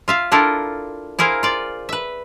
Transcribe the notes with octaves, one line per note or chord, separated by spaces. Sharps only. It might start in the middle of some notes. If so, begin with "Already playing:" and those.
F4 E5 F5
D4 E4 F4 A4 A#4
E4 G#4 A#4 C5 F5
F4 D5
B4 E5